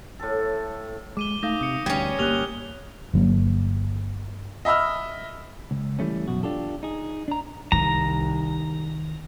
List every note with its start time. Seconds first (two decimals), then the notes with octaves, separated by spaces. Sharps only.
0.19 A2 A4
1.17 G#3 D6 D#7 G7
1.43 A3 D#4 F5 D#6 G6 A#6
1.61 C3 D#6 C#7
1.86 D2 G3 C#4 G#6
2.19 G1 A#3 G4 F6 F#6 F7 G7
3.14 G1 F#3 A#3
4.65 D#5 E5 B5 E6 F6
5.71 C#2
5.99 E3 G3 A3 C#4
6.27 F#2 B2 F#4
6.43 D4 F4 G4 A4
6.83 D#4 G#4
7.28 D4 A#5
7.72 C2 D#3 D#4 A#5